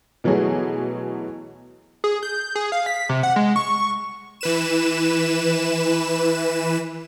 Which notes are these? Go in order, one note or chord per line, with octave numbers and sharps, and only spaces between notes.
B2 E3 F#3 A3 G#4
G#4
G6
G#4
F5
B6
C3
F#5
G#3
C#6
E3 B4 E7